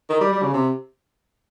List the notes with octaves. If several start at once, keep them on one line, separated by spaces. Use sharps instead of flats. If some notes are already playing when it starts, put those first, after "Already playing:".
D#3
G3
G3
C#3
C3